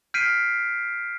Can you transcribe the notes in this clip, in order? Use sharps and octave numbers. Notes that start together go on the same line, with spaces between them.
F6 G6 B6 C7 D7 D#7